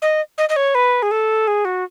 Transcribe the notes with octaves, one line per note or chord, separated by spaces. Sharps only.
D#5
D#5
D#5
C#5
B4
G#4
A4
G#4
F#4